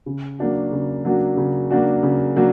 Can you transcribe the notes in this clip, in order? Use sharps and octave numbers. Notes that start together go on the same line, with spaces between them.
C#3
F#3 A#3 D4 F#4
C#3
F#3 A#3 D4 F#4
C#3
F#3 A#3 D4 F#4
C#3
F#3 A#3 D4 F#4